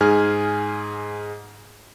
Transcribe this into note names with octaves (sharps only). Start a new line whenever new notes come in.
G#2 G#4 G#5 F6